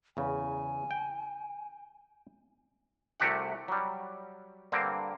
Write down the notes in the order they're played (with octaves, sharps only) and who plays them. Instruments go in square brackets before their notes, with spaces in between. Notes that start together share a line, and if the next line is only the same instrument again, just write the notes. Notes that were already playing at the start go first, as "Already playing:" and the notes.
[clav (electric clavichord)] E2 C#3 [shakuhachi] G#5
[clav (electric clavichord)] G5
C2 C3 A3 F#4 G4 F#5
F#3 G3
G2 D3 A#3 C4